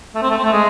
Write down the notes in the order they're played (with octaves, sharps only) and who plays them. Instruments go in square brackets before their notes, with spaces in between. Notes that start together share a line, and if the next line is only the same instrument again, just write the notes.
[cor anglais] A3
C4
A3
C4
A3
G#3